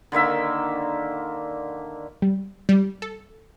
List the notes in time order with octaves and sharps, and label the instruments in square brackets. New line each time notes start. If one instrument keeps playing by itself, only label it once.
[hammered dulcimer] D3 D#3 A#3 E5
[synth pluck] G3
G3
A4